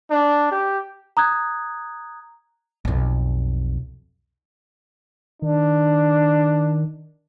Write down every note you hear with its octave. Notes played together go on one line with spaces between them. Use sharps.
D4
G4
A#5 D#6 F#6 G#6
B1 F2
D#3 D4